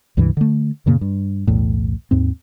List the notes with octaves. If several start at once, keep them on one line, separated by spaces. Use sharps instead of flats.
C#2 G2 C3 E3
D3 A3
F#2 A#2 C#3 A#3
G2
B1 E2 A2
D#2 G#2 C4